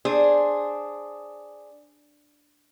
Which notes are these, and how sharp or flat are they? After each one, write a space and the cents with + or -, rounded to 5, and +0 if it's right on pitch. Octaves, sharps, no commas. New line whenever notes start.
D4 +0 G#4 +0 C5 +10